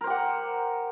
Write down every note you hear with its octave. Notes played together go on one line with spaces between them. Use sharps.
G4 A#4 C5 F#5